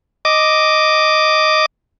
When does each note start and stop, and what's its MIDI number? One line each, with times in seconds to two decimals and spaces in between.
0.25 1.66 75
0.25 1.66 86